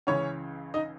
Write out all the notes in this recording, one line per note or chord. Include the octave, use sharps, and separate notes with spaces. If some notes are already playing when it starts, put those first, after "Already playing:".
C#2 C#3 E3 C#4 C#5
D#4 D#5